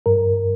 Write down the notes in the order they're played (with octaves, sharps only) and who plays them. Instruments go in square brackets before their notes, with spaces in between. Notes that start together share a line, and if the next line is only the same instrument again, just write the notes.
[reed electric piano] G2 A#4